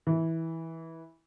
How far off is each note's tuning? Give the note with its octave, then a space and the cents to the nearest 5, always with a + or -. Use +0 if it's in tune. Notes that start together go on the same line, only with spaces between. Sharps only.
E3 -15